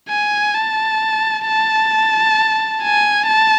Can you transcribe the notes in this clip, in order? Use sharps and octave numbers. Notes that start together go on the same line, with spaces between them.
G#5
A5
A5
G#5
A5